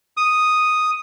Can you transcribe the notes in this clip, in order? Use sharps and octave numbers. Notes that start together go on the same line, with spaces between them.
D#6